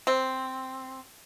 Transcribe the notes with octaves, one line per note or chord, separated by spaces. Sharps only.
C4